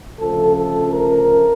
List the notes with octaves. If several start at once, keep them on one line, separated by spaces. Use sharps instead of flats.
D2 C#3 F3 A3 A4
A4
A#4